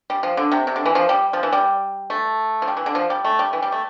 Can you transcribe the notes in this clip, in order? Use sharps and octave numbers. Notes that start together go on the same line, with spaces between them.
G3
F3
D3
C3
C3
D3
E3
F3
G3
F3
E3
G3
A3
F3
G3
E3
D3
F3
G3
A3
G3
E3
G3
A3